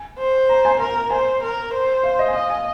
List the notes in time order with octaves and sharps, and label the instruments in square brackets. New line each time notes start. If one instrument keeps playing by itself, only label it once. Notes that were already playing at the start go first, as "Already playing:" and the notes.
Already playing: [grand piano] G#5
[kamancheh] C5
[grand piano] A#5
G#5
[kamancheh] A#4 [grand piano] A#5
[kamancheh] C5 [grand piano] G#5
[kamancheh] A#4
C5
[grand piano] F5
D#5
G#5
[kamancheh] D#5 [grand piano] F5
[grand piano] G#5